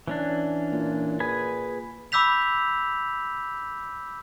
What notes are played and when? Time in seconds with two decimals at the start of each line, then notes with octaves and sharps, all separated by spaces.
0.08 E3 C#4 D4
0.72 A#2
1.20 G#4 B4 G#5
2.12 B5 D6 E6 G6 B6 F7